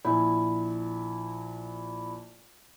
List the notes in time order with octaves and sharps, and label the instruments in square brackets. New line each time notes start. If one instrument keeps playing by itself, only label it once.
[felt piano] A#1 E4